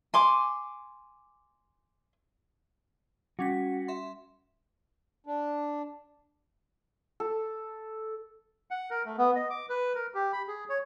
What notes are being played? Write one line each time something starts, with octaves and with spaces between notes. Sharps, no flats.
G#5 C6 D6
G3 C#4 F#4 B6
E5 C6
D4
A4
F#5
A#4
A3
B3
D#5
D6
B4
A#4
G4
B5
G#4
C#5